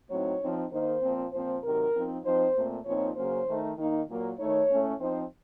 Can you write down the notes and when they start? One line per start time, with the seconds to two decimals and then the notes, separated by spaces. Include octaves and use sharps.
0.10 A2 F#3 C4 D#4 C#5
0.41 F3 C4 D#4
0.71 D#3 A#3 D#4 C5
1.02 A#2 F3 C4
1.32 A#2 F3 C4 C5
1.63 C3 D#3 F#3 A#4
1.94 F3 C4 D#4
2.24 F3 C4 D#4 C5
2.55 A#2 A3 C4
2.86 A#2 F3 C4 D#4 C#5
3.16 C#3 F#3 A#3 C#4 C5
3.47 D#3 A3 D#4
3.78 D#3 A#3 D#4
4.08 A#2 F#3 A#3
4.39 D#3 A3 D#4 C#5
4.70 A2 A3 C#4
5.00 F3 C4 D#4 C5